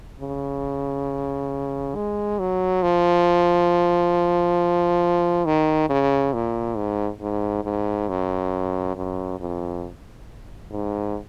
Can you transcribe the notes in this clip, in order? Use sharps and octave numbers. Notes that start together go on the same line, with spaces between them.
C#3
G#3
F#3
F3
D#3
C#3
A#2
G#2
G#2
G#2
F#2
F#2
F2
G#2